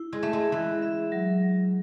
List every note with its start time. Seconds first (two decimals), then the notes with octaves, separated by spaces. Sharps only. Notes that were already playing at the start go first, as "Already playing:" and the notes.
Already playing: E4
0.13 G#3
0.23 A3 E5
0.33 G#3
0.52 E3 E4
0.82 E5
1.12 F#3
1.42 F#3